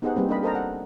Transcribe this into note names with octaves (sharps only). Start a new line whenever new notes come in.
B3 D#4 G4 G#4 C5 F#5
G3 A#3 C4 B4
D4 A#4 D#5 B5
A4 A#4 C5 D#5 A5 A#5
F#5